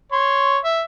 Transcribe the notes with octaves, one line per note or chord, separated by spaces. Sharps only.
C#5 C6
E5